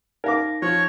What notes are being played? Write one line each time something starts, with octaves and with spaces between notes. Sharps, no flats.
D#4 A#4 F5 D6 A#6
F3 C#5